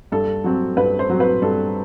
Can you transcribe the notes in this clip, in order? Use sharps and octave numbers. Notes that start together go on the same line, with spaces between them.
G2 A4
F#3 C4
G2 B4
C5
F#3 C4
B4
G2 A4